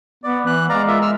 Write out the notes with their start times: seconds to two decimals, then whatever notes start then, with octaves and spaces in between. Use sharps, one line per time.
0.24 B3 D5
0.47 E3 F#6
0.69 G#3 D5 F5 A#5
0.88 F4 A#4 E5
1.02 E6 F6